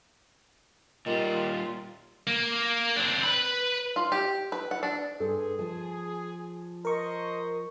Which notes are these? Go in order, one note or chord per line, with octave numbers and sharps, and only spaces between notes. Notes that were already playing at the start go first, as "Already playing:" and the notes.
A#2 D#3 G3 F4
A#3
C4 D4
B4 B5
F4
G4
B4
F#5
D4
G2 G#4 A4 C5
F3
A#4 C5 D#5 C#6